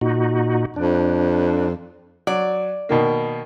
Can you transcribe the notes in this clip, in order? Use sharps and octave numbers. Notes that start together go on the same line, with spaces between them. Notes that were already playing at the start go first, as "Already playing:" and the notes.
A#2 D#4 F#4
F2 D4
F#3 D5
B2 D#3 A#3